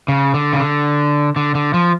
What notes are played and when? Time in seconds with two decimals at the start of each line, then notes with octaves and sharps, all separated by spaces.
0.08 C#3
0.34 D3
0.53 C#3
0.60 D3
1.36 D3
1.55 D3
1.74 F3